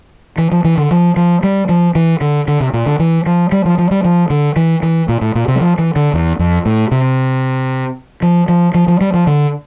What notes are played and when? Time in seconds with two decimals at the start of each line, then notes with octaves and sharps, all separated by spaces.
0.38 E3
0.52 F3
0.64 E3
0.77 D3
0.91 F3
1.16 F3
1.43 G3
1.69 F3
1.95 E3
2.21 D3
2.48 D3
2.60 C3
2.73 A#2
2.86 D3
2.99 E3
3.26 F3
3.52 G3
3.65 F3
3.78 F3
3.91 G3
4.05 F3
4.30 D3
4.56 E3
4.83 E3
5.09 A#2
5.21 A2
5.35 A#2
5.48 C3
5.56 G3
5.61 F3
5.78 E3
5.96 D3
6.14 E2
6.39 F2
6.66 A2
6.92 C3
8.22 F3
8.48 F3
8.74 F3
8.88 F3
9.01 G3
9.14 F3
9.27 D3